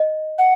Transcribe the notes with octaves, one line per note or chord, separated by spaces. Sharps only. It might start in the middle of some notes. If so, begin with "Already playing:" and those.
Already playing: D#5
F#5